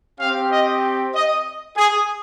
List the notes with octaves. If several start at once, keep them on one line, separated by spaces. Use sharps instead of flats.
C4 G4 F5
D#5
D#5
G#4